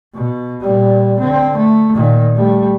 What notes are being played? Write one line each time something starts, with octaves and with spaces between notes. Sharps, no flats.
B2
A#2 G3
D3 C4
A3
A#2 D#3
G3 A3